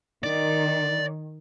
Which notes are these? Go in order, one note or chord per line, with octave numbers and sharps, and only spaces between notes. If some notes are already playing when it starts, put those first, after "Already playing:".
D#3 D5